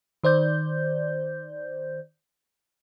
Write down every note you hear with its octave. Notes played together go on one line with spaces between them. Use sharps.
D#3 C5 D5 G6